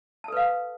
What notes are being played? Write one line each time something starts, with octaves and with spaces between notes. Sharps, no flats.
A4 B4 F5 A5